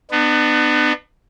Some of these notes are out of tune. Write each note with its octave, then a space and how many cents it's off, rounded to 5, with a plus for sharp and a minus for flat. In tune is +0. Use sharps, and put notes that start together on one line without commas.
B3 +20 D4 +40